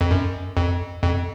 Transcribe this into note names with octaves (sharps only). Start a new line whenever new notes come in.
F2
F#2
F2
F2